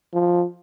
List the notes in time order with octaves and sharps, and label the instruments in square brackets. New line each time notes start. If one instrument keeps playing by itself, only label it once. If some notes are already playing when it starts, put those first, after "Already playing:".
[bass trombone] F3